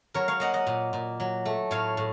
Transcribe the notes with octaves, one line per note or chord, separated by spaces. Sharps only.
F#3 A#4 C#5
C#5 F5
A#3 D#5 F#5
D#5 F#5
A#2
A#2
F#3
A3
A2 C#5 F5
A2